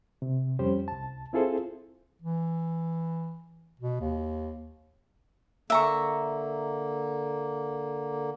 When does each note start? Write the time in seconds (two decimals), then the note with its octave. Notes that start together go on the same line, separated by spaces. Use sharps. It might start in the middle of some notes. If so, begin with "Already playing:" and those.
0.22 C3
0.59 F2 G3 C#4 G4 C5
0.88 C2 A5
1.33 C4 E4 F4 G#4 A4 C5
2.22 E3
3.80 B2
4.01 D#2
5.70 D3 A#3 E5 A#5 C#6